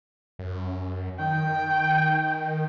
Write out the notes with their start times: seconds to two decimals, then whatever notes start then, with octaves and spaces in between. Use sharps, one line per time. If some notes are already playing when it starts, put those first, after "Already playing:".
0.39 F#2
1.19 D#3 G5